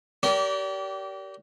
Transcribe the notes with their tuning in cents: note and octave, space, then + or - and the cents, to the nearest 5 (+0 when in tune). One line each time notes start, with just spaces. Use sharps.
G4 -25 A#4 +0 D5 -35